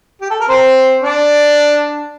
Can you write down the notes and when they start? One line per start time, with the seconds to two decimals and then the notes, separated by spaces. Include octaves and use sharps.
0.21 G4
0.30 A4
0.40 A#4
0.48 C4 C5
1.02 D4 D5